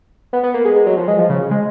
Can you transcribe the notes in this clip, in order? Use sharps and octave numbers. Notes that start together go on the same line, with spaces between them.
B3
B3
A#3
G#3
G#3
F#3
F3
G#3
F3
C#3
G#3